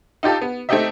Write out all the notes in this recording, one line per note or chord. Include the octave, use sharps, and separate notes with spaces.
D#4 F4 G4 A4
B3
A3 C4 D#4 G4 D#5 E5